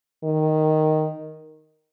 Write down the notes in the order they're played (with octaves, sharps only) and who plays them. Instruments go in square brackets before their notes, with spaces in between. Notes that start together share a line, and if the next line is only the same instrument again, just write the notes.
[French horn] D#3